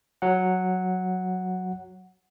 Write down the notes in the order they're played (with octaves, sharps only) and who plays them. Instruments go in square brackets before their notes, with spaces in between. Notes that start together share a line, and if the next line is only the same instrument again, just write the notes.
[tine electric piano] F#3 F#5